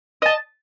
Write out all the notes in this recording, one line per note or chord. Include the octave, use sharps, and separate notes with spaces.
D#5 A5